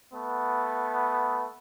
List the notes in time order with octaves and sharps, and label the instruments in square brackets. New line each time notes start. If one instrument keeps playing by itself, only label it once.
[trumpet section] A3 B3